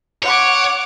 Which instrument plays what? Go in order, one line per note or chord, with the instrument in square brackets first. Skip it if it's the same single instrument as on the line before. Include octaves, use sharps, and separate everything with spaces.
[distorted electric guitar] C#5 [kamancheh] F#5 D6